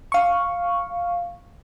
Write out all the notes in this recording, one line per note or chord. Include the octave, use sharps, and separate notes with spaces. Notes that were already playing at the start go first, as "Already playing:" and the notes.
F5 C#6